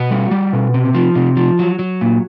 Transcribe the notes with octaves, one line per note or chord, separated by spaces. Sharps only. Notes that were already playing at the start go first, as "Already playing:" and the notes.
Already playing: B2 F#4
G3
G3
B2
C3
F3
C3
F3
F#3
F#3
A#2